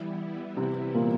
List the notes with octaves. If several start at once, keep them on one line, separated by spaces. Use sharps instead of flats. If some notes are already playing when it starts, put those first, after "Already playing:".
Already playing: E3 G3 B3 E4
C3 C4
A#2 A#3